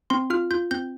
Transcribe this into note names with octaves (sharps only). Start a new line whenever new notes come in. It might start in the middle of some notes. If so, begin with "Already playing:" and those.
C4 C6
F4 F6
F4 G6
C4 G6